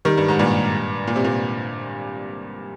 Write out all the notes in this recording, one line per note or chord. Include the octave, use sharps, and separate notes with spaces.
D#3 G3
G2
G#2
G2 A#2
A#2
C3
A#2